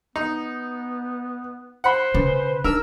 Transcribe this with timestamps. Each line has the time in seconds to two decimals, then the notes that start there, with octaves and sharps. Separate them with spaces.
0.16 B3 D#4
1.84 C5 F#5 B5
2.14 C#3 B4
2.64 D4 D#4 A#4 E6